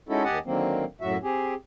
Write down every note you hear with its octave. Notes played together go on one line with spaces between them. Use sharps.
G#3 C#4 D#4 E4 F#4 A4
D#2 G4 D#5 F#5 G#5 A5
D3 D#3 F#3 A#3 C4
F#2 A2 F#3 F#4 E5
C4 G4 G#4